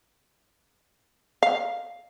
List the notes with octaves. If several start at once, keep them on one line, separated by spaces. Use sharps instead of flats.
F5